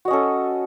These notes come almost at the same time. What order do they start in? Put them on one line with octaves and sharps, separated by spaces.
F#4 D#5 C#4 A4